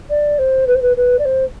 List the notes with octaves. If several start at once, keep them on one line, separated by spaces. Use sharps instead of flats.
D5
C5
B4
C5
B4
B4
D5
C5